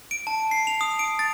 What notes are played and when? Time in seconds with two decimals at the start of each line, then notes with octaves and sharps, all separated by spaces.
0.11 D7
0.27 A5
0.51 C7
0.67 F7
0.81 D#6
0.99 D7
1.19 A6